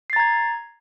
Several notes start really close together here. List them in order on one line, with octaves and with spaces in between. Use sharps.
C7 A6 A#5 G#6